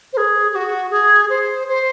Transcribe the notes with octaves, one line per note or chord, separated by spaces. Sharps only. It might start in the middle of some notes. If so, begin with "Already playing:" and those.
C5
G#4
G#4
F#4
G#4
C5
C5